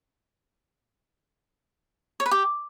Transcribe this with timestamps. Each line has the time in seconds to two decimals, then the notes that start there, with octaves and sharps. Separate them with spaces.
2.20 C#5
2.26 B4
2.31 G4